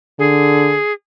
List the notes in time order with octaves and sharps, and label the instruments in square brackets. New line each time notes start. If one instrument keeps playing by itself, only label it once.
[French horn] D3 [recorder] G#4